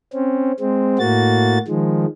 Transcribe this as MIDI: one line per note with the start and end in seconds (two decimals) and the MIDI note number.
0.13 0.52 60
0.13 0.52 61
0.60 0.98 56
0.60 0.98 60
0.99 1.58 45
0.99 1.58 58
0.99 1.58 66
0.99 1.58 93
1.67 2.06 51
1.67 2.06 53
1.67 2.06 56